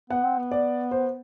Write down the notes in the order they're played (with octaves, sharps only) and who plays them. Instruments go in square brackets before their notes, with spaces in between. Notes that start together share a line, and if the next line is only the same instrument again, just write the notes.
[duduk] B3 [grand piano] F#5
[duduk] C4
B3
[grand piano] D5
C5